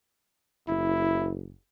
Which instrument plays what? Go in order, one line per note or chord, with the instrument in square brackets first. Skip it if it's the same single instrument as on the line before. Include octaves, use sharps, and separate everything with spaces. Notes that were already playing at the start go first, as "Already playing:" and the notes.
[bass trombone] F#1 [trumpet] E4